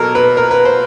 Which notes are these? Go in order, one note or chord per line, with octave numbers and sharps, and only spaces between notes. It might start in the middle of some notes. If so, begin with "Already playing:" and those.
Already playing: B2 F#3 A#3 A4 A#4
B4
A#4
B4
C5